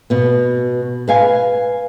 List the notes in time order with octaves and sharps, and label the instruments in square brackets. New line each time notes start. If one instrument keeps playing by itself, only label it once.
[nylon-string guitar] B2 B3
B4 F5 G#5